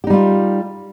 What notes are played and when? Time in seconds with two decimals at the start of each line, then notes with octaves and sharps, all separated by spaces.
0.04 G4
0.07 D#4
0.10 G3
0.13 F4